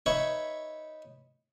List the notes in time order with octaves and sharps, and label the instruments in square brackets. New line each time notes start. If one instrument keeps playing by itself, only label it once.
[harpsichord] D#4 B4 C#5 E5 B5 C#6